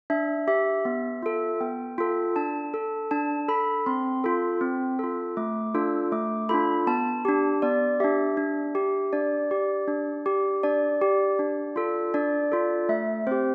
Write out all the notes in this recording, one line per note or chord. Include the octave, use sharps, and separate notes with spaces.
D4 E5
G4 E5
B3
F4 A4
B3 G5
F4 A4
D4 A5
A4
D4 A5
A4 B5
C4 C6
F4 A4
C4
F4 A4
A3 D6
D4 F4 A4 E6
A3 D6
D4 F4 A4 B5
B3 A5
D4 G4
B3 D5
D4 G4 E5
D4
G4
D4 D5
G4
D4
G4
D4 D5
G4
D4
F4 A4
D4 D5
F4 A4
A3 E5
C4 G4 C5